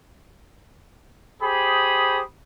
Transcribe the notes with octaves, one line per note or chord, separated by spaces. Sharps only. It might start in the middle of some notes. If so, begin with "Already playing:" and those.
G4 G#4 C5 B5 D#6